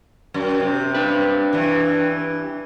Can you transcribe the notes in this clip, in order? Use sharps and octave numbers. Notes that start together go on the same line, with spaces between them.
F#2
C3
D4 B4
G2 E3